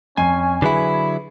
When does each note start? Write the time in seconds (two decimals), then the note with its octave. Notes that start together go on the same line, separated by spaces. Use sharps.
0.17 F2 C#4 G#5 C7 D#7
0.62 D3 F#3 E4 G#4 B4 B5